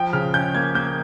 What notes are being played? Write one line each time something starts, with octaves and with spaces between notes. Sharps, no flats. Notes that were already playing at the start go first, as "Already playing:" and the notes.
Already playing: F3 G5
C#3 F6
C#4 G6
A#3 G#6
A#3 G6